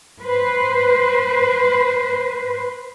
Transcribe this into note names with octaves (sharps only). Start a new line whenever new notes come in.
B4 C5